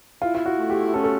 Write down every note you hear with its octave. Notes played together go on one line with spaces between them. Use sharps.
E4 F4
F4
F#4
A3
G4
C#4 A4
A4